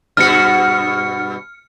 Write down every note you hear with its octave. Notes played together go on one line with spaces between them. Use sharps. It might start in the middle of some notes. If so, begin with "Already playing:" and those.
G2 B2 F#4 F6 C#7